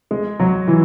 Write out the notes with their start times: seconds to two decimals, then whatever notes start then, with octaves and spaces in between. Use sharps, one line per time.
0.11 G#3
0.40 F#3
0.68 E3